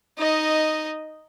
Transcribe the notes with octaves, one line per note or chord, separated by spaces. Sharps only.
D#4 D#5